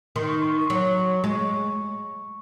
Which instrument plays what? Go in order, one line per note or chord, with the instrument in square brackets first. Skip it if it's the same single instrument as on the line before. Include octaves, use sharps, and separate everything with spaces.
[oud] D#3 [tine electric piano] C6
[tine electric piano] C#6
C6
C#6
[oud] F#3 [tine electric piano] C6
[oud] G#3 [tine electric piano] C#6